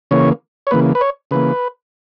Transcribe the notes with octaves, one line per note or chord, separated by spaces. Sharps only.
C#3 E3 A#3 C#5
C#5
C#3 E3 A#3 B4
B4
C#5
C#3 E3 A#3 B4